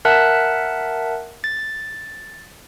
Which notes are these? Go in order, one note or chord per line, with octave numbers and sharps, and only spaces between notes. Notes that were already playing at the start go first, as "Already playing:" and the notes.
A#4 E5 F#5 A5 F#6
A6